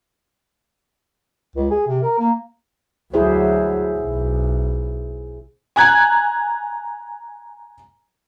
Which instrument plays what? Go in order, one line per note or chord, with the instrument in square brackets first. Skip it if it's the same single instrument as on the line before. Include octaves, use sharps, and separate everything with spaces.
[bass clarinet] C#2
G#4
C3
A#4
A#3
[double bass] D2 F#3 [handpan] E4 G#4 C5
[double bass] B1
[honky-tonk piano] G#5 A#5 F#6 G#6